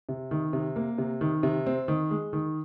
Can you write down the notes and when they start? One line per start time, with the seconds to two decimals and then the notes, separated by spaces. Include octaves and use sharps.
0.09 C3
0.31 D#3
0.53 C3
0.76 A#3
0.98 C3
1.21 D#3
1.43 C3
1.66 C4
1.88 D#3
2.11 G#3
2.33 D#3